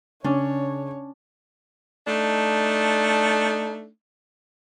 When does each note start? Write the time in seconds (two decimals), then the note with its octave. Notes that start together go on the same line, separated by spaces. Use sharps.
0.24 C#3 C#4 D4 C#5
2.06 A3 D4 D#4